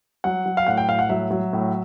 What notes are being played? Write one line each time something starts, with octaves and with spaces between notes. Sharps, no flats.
F#3 F#5
F#3
F5
A2 F#5
G5
A2 F5
F#5
F#3 E5
F#3
A2